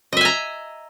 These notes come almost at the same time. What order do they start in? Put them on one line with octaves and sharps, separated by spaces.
D#5 E5 G#5 A#5